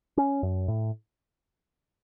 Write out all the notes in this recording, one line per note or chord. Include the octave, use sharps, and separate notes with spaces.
C#4
F#2
A2